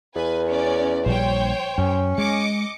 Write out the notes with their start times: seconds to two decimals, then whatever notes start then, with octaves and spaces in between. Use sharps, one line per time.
0.15 E2 B4 G#5
0.47 C#4 D5
1.06 A#1 G3 C5 C#5 G5
1.78 F#2 C#4
2.18 G#3 D#5 D6 C#7